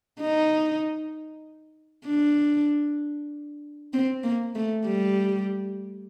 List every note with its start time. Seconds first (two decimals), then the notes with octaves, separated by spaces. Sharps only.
0.20 D#4
2.06 D4
3.93 C4
4.23 A#3
4.55 A3
4.85 G3